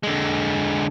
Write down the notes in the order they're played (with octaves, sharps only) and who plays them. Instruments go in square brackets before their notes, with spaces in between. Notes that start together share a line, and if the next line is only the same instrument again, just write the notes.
[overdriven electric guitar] D3 G#3